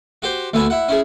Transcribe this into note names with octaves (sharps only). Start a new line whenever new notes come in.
F#4 G4 C5
D2 B3 E5 G#5 B5
E4 F#5
C#4 E4 G#4